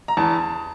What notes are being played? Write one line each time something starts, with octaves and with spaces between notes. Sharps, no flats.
A#5
E2 A5